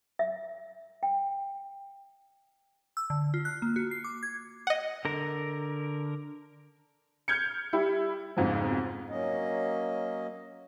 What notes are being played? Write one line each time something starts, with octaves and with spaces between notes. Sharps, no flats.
E5
G5
E6
D3
F4
F#6
A#3
F#4
C7
D6
G#6
D#5 F#5
D3 A#4
F6 G6 G#6 C#7
G3 E4 G4
B1 F2 G#2 C#3 F3
F#3 A#3 C#4 D#5